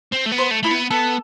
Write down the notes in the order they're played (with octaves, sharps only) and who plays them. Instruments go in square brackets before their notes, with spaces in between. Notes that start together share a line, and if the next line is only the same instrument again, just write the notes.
[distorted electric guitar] C4
A3
B3
[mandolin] C5
[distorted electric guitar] A3
[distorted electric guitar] A3 [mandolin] E4
[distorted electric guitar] B3
[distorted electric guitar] B3 [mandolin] A4